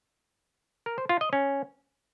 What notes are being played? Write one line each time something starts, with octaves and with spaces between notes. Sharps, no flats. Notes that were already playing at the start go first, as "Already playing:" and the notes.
A#4
C5
F4
D#5
C#4